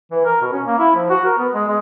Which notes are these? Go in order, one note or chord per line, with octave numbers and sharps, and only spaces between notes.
E3
A#4
B2
C#4
A#3
E4
F3
F#4
A#4
B3
G#3
G#3